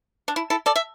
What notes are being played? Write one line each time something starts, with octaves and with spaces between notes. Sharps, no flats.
D4
E4
E4 A4
A4 D5
E5